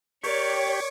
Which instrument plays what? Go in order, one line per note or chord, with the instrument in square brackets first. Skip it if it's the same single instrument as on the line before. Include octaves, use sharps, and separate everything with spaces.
[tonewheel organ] G4 [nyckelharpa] A#4 D5 [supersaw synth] C#5 [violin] C#6 D6